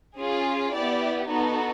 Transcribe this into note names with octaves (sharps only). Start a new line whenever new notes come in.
C#4 F4 G#4
B3 E4 G4 D5
B3 D#4 F#4 A4